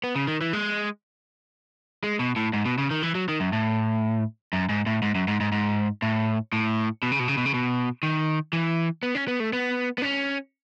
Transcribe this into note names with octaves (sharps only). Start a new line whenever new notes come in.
B3
C#3
D#3
E3
G#3
G#3
B2
A2
G#2
B2
C#3
D#3
E3
F#3
D#3
F#2
A2
F#2
G#2
A2
G#2
F#2
G#2
G#2
G#2
A2
A2
B2
C#3
B2
C#3
B2
C#3
B2
D#3
E3
B3
C#4
B3
A3
B3
B3
C#4